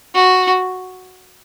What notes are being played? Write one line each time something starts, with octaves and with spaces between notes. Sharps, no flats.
F#4